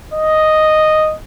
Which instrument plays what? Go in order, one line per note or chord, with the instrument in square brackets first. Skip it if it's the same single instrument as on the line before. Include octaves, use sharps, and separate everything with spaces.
[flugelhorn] D#5